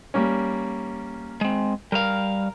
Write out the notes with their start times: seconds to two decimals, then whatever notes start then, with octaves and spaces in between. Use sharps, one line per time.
0.14 G3 A#3 C#4
1.41 G#3 C4
1.92 G3 A#4 F5